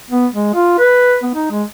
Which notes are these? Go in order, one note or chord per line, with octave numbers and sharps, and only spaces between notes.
B3
G#3
F4
B4
B3
D#4
G#3